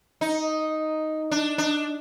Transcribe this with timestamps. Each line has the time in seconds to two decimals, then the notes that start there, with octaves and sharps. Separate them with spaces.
0.21 D#4
1.31 D4
1.58 D4